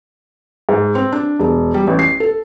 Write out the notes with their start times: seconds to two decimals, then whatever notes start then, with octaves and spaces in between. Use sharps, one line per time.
0.69 G#2
0.95 C4
1.12 D4
1.39 E1
1.74 G3
1.87 A1
1.99 C7
2.20 A4